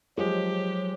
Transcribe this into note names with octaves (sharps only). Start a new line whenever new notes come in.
F3 F#3 G#3 G4